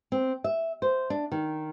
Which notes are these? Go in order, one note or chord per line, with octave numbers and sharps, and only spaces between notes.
C4
E5
C5
D4
D#3